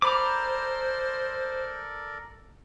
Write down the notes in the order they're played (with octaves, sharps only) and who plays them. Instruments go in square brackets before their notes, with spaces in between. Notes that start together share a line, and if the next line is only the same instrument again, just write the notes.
[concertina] A4 A#4 D5 [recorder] C5 [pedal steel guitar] A#5 B5 D6